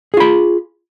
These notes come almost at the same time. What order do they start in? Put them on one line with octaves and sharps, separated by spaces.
G#4 F4 B5